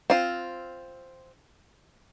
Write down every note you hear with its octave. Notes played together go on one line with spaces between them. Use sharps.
C4 F4